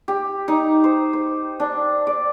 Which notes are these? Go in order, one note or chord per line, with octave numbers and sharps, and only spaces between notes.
G4
D#4
C5
C5
D4
D5